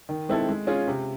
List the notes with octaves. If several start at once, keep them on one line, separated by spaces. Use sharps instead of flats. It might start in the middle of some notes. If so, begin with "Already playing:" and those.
D#3
G#3 C4 E4 A4
G#3
C#4 F4 G#4
C3